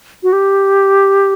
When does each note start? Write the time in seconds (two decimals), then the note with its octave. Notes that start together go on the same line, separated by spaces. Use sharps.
0.23 F#4
0.33 G4